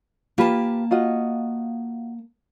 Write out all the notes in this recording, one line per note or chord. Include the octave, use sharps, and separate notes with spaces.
A#3 F4 G4 B4 A5
F4 F#4 D#5